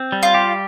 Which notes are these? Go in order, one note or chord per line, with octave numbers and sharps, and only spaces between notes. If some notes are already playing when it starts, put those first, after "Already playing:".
Already playing: C4
G3
F4
G4